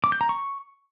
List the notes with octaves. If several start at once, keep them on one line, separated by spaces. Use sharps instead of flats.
D6
G6
A#5
C#6